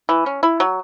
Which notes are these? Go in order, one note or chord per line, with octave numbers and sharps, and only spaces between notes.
E3
C#4
E4
F#3